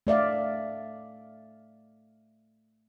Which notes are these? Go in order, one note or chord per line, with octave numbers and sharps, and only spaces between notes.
A3 D5 E5 F5